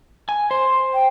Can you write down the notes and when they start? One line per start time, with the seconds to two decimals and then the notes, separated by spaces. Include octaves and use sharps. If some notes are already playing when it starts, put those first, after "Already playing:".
0.29 G#5
0.51 C5 C6
0.94 G5